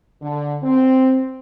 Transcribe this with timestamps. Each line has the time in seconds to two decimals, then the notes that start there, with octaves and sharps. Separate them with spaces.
0.21 D3
0.63 C4